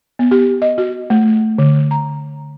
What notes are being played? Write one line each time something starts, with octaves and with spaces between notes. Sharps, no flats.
B3
G4
D#5
F#4
A3
D3
A#5